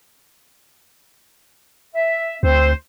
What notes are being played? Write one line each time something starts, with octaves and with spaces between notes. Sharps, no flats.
E5
D2 C4 C5